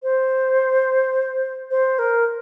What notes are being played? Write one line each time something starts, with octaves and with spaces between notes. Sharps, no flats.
C5
C5
A#4